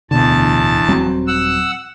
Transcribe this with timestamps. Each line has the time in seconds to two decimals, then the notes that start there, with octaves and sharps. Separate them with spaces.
0.11 D1 E2 B2 D3 A5
0.88 D#1 F#3 C4
1.27 F#5 E6